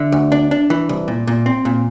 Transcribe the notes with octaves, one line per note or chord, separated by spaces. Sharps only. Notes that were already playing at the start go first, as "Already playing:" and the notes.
Already playing: D3 E5
D2
D4
D4
E3
C2
A#2
A#2
C4
A#2